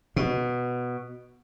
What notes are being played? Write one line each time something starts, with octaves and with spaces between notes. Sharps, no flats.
B2